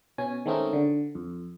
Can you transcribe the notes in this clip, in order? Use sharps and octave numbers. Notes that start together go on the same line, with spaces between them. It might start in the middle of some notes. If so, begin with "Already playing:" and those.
B2 C#4 G#5
D#3 G#3 A3 C4 C#4 D#4
D3
F2